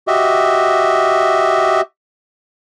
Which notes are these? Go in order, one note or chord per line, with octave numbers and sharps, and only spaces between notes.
F#4 G4 D#5 E5